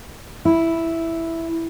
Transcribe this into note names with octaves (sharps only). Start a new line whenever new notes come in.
E4